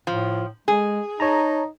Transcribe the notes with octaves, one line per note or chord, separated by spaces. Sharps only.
A2 F3
G#3 G#4
D#4 C#5 A5 A#5